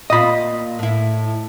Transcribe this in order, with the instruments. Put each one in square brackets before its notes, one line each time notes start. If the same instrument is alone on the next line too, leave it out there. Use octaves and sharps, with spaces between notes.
[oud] A#2 F4 [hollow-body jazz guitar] D#5 B5
[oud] A2 E4